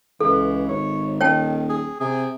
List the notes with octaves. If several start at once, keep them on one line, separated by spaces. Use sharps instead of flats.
C#2 E3 A4
G#1 C#5
D#1 D#3 C#5 G5 A5
G#4
C3 G#4